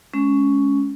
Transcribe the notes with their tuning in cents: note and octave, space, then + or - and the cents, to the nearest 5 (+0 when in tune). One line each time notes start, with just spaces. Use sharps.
G#3 +25 C#4 +10